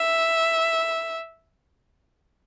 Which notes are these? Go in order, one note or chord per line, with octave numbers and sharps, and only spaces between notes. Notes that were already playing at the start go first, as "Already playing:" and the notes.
Already playing: E5